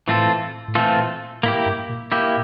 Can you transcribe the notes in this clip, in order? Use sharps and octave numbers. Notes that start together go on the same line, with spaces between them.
A2 E3 A3 C4 F4 A4
A2
A#2 E3 A3 C4 F4 A4
A2 A#3 E4 G4
G2
A#2
A#3 E4 G4